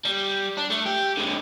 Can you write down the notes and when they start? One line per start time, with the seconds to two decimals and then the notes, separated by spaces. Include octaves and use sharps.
0.05 G3
0.58 D4
0.71 A3
0.86 G4
1.17 D3 G#3